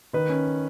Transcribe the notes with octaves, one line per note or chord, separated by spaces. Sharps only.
D#3 B4
C#4